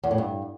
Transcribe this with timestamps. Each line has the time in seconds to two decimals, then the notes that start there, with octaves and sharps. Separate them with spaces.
0.03 E2
0.11 A2
0.18 G2